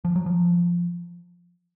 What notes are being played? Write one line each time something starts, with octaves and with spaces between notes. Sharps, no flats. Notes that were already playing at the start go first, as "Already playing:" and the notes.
F3
F#3
F3